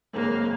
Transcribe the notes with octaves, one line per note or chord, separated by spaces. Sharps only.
G#1 F#2 C#3 G#3 A#3 C4